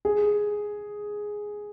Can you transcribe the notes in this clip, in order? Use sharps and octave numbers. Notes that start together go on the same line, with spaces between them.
G#4